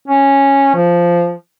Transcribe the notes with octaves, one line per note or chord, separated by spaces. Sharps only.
C#4
F3